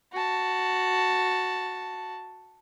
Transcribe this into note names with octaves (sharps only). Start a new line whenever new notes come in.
F#4 A5